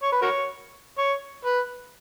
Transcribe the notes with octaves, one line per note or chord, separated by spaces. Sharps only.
C#5
B4
F#4 A#4 C#5
C#5
B4